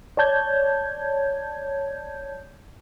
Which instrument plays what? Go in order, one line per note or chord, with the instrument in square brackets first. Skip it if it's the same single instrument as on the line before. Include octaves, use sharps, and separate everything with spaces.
[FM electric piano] C#5 D5 A5 G6 G#6